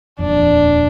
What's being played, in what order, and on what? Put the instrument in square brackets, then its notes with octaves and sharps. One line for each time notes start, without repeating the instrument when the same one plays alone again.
[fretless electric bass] D#1 F2 [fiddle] D4